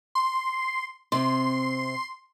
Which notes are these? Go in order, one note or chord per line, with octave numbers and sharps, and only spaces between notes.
C6
C3 C4 C6